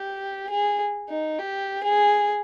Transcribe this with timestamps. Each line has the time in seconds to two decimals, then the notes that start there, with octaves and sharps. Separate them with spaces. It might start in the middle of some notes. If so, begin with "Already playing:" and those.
Already playing: G4
0.50 G#4
1.09 D#4
1.38 G4
1.83 G#4